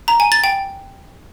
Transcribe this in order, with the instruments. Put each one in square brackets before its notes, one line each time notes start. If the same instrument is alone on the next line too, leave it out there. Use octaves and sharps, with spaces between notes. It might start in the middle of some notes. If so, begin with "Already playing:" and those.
[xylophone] A#5
G#5
A6
G5